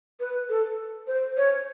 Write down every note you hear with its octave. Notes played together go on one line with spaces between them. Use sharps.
B4
A4
C5
C#5